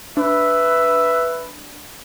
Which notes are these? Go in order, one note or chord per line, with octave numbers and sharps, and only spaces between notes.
D4 B4 E5